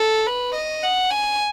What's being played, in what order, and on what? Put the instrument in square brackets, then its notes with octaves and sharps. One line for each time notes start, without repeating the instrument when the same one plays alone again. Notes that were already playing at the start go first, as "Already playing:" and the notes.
Already playing: [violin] A4
B4
D#5
F#5
G#5